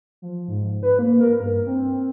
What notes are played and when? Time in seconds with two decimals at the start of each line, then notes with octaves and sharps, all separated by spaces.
0.22 F3
0.48 G#2
0.83 B4
0.99 A#3
1.20 A#4
1.40 G2
1.66 C4